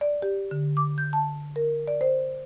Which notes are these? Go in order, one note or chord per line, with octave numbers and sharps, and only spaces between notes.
D5
G4
D3
D6
G6
A5
A#4
D5
C5